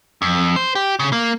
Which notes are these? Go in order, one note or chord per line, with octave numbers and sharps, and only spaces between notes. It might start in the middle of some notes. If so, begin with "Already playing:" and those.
F2
C5
G4
C#3
A#3